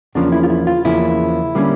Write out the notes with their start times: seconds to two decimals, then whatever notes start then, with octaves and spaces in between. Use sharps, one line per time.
0.15 E2 C#3 F3 A#3 C#4 D4
0.32 E4
0.43 F4
0.50 E4
0.67 F4
0.85 E2 C#3 F3 A#3 C#4 E4
1.55 D3 G3 A#3 C#4